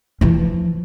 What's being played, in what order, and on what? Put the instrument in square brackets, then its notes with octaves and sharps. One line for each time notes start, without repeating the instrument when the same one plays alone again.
[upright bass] E3 F3